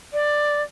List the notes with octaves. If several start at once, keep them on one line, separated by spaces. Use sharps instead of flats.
D5